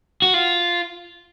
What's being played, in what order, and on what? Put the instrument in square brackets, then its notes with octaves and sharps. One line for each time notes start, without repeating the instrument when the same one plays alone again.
[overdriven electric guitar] F#4
F4